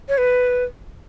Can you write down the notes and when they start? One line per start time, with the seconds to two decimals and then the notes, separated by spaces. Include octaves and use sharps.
0.09 C#5
0.18 B4